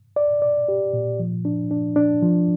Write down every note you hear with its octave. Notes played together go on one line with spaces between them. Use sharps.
D5
D5
G4
A#2
F3
D4
D4
D4
F3